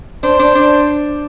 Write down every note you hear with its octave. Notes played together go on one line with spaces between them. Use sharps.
D4 C5
D4
D4